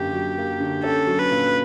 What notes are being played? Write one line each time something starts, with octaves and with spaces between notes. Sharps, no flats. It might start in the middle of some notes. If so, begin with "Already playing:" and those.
Already playing: F#2 D3 A#3 G4
F#3
A#3
D3
C#4 A4
F#3
B4
A#2